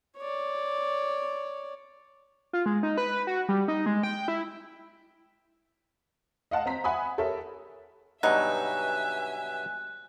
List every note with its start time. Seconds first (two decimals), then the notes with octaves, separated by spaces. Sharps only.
0.17 C#5 D5
2.53 F4
2.66 G#3
2.83 D#4
2.98 B4
3.27 F#4
3.49 G3
3.68 D#4
3.86 G#3
4.03 G5
4.28 E4
6.51 D#5 F5 F#5 A5
6.66 C4 C5 A#5 B6
6.84 E5 F#5 G#5 B5 D#6
7.18 G4 A4 A#4 C#5 E5
8.23 G2 B2 F#3 D#4 E5 G#5 F#6